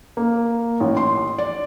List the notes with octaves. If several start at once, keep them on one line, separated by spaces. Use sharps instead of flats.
A#3
A1
C6
D5